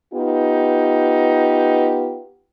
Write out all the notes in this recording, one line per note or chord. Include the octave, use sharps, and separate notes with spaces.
B3 D#4 F4 G4